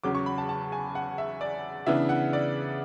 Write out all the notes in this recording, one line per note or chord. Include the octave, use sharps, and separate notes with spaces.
E2 C#3 F#3 C#4 D6
C#6
B5
A5
A5
G#5
F#5
E5
D5
C#3 E3 B3 D4 E5
F#5
D5